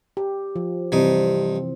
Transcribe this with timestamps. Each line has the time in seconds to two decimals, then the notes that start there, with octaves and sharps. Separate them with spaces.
0.17 G4
0.56 F3
0.92 G2 C3 E3 C4 D#4